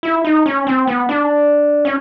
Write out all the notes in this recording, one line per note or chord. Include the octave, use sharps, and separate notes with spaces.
E4
D#4
C#4
C4
B3
D4
C#4